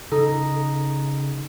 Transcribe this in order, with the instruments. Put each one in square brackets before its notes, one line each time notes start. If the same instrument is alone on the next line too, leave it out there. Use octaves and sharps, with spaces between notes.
[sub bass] C#3 [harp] D#4 [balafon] A4